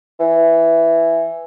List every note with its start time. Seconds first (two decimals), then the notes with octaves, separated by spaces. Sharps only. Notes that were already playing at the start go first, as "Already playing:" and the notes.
0.20 E3